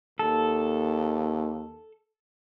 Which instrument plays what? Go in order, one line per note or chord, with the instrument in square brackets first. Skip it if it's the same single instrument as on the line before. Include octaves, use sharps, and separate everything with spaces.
[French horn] D#2 [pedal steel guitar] A4